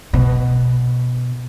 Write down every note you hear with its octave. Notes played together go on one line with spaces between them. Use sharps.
B2